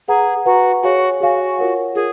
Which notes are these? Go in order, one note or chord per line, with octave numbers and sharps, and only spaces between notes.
G#4 B4 F#5 A#5
F#4 B4 F#5 A#5
F#4 G#4 C#5 F5 G#5
F#4 G#4 C#5 F5 G#5
F4 A#4 C#5 F#5
F4 G#4 A#4